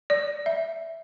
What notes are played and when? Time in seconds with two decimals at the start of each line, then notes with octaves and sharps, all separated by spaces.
0.10 D5
0.46 E5